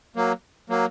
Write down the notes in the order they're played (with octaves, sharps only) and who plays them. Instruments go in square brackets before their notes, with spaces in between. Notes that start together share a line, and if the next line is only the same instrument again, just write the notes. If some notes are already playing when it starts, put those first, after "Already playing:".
[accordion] F#3 A#3
F#3 A#3